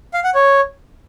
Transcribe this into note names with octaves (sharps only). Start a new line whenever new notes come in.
F5
F#5
C#5